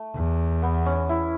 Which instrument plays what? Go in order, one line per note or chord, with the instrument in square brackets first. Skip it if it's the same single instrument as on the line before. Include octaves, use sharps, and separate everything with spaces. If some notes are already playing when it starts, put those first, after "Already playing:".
Already playing: [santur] A3
[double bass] E2
[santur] B3
C#4
E4